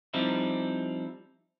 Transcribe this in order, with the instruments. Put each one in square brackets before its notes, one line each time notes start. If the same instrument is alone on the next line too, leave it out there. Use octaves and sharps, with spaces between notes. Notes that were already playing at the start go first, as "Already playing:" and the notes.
[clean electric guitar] F3 G3 C4 D#4 E4